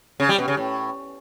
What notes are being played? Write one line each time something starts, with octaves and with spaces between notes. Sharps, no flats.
C#3
G3
B2
C#3
A2